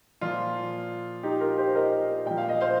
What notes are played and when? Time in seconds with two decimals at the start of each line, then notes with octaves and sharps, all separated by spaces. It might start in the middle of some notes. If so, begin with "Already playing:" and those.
0.21 A#2 F3 F4
1.23 D#4 G4
1.40 F4 A#4
1.58 G4 C5
1.75 A#4 D#5
2.26 A#2 F3 G5
2.37 F5
2.49 D#5
2.61 C5 F5